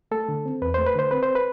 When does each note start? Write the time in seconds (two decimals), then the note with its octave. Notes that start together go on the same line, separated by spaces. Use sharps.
0.11 A3 A4
0.29 D3
0.45 C4
0.62 E2 B4
0.74 A3 C5
0.87 B4
0.95 D3 C5
1.11 C4 B4
1.23 C5
1.35 B4